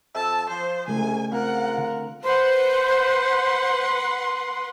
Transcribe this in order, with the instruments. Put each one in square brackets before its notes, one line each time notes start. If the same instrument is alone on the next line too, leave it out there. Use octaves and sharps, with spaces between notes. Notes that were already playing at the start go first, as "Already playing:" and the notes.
[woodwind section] F2 E6 [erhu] A5
[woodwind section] F3 [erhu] C5
[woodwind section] C2 [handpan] C#3 G#3 A3 [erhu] G#5
[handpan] C4 [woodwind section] F4 A#4 [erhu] F#5
[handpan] D3
[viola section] B4 F#5 [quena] C5 [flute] C6